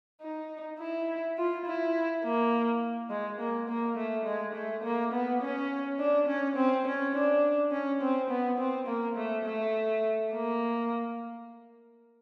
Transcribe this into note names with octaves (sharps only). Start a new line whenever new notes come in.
D#4
E4
F4
E4
A#3
G#3
A#3
A#3
A3
G#3
A3
A#3
B3
C#4
D4
C#4
C4
C#4
D4
C#4
C4
B3
C4
A#3
A3
A3
A#3